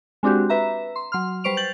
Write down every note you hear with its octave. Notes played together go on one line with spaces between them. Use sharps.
G#3 C4 D4 F#4 G4
B4 E5 A#5
C6
F#3 C6 F6
G3 B4 C5 C#6 D7 F7
G6 A6 F#7